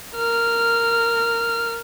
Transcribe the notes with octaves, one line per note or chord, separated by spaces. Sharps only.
A#4 F6